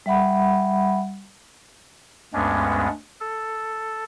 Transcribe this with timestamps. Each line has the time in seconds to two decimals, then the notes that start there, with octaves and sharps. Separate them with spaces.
0.06 G3 E5 F#5 B5
2.34 D2 G2 G#3 B3 C#4 D4
3.20 A4